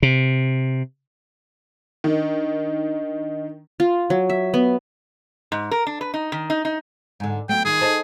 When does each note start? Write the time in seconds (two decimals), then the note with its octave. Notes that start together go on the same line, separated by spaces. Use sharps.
0.02 C3
2.04 D#3 D4 D#5
3.80 F4
4.10 F#3
4.30 E5
4.54 B3
5.52 G#2
5.71 A#4
5.87 D4
6.01 B4
6.14 D#4
6.32 D#3
6.50 D#4
6.65 D#4
7.20 G#2 D3
7.49 F#3 A3 B3 G5
7.65 D#3 F4 G#4
7.81 D#4 A4 C5